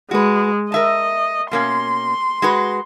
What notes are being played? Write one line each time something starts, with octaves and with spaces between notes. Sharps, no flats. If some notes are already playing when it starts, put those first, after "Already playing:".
G#3 F#4 B4
A#4 D#5 E5 A5
B2 A#3 C#4 C6
G#3 F#4 B4